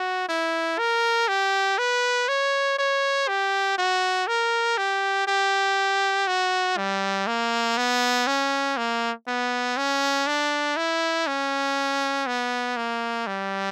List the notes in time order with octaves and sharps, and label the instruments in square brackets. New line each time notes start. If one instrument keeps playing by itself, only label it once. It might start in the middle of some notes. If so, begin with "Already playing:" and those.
Already playing: [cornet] F#4
E4
A#4
G4
B4
C#5
C#5
G4
F#4
A#4
G4
G4
F#4
G3
A#3
B3
C#4
A#3
B3
C#4
D4
E4
C#4
B3
A#3
G3